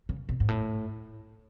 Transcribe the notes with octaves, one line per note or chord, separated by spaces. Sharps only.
C#3
B2
G#2
A2